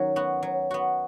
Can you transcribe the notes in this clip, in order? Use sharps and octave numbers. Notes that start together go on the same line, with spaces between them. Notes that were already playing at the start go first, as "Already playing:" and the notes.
Already playing: D#3 F#3 C#4
B3 F#4
F#3
B3 F#4